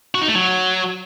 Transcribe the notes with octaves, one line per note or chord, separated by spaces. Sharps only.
F#4
D#4
A3
F#3